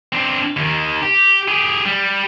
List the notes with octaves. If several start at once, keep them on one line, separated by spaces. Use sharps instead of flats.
C4 D4
D#2 D#3
G4
G4 G#4
G3